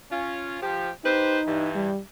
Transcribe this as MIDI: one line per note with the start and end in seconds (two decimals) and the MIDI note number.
0.10 0.59 61
0.10 0.59 65
0.61 0.90 53
0.61 0.90 67
1.04 1.70 63
1.04 1.38 67
1.04 1.38 71
1.04 1.38 72
1.46 1.91 43
1.46 1.91 52
1.75 2.00 55